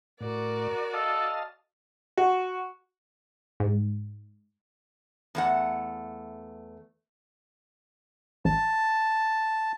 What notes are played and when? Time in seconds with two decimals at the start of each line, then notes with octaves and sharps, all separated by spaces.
0.21 A2 F#4 A#4 D5
0.94 A4 D#5 F5 A5
2.17 F#4
3.60 G#2
5.35 E2 A3 F#5
8.45 A1 A5